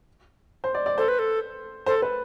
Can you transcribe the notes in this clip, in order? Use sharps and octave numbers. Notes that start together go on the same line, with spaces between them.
C5
D5
D5
A4 C5
B4
A4
A4 C5
B4